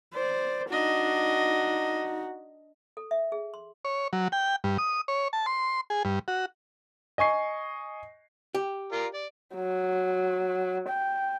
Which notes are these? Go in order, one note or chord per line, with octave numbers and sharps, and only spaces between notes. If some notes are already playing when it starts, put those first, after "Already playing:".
C5 D5
D4 D#4 F#4 D#5
A4
E5
G#4
C6
C#5
F#3
G5
G2
D#6
C#5
A5
C6
G#4
G2
F#4
D#5 G#5 C#6 C7
G4
F4 A#4 D5
D5
F#3
G5